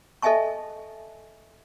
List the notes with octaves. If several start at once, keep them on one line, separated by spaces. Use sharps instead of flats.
A4 D#5 E5 G#5 A5 C#6